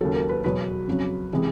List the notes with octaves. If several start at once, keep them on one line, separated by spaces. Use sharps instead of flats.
D#2 C#3 F#3 A4
A#4
B4
E2 B2 F#3 B4
F2 C#3 F#3
C3 E3 G#3